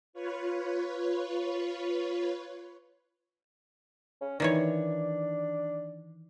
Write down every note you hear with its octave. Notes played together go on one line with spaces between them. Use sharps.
F4 B4 C#5
C#4
D#3 E3 D4 C#5